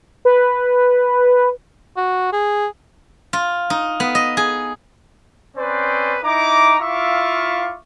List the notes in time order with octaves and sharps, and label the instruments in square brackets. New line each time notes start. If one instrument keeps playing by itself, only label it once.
[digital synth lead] B4
[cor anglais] F#4
G#4
[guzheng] F4
D#4
B3
D#5
G#4
[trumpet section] C4 C#4 B4 C5 D5
D#4 E4 A#5 D6
E4 F4 E5 F5 C#6 D6